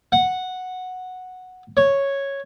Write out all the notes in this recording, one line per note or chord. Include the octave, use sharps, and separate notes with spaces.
F#5
C#5